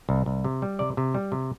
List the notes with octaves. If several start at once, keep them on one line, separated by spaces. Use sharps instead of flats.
C2
C2
C3
G3
C3 D5
C3
G3
C3